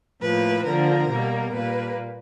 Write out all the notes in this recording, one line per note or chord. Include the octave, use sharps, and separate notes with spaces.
A2 F3 A#3 B4
D3 F3 A#3 A#4
B2 G3 A#3
A#2 G3 A#3 B4